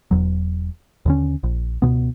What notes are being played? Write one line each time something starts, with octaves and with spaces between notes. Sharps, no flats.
E1 E2 F#3
D#2 D3 C#4
A#1
C#2 G2 B2 B3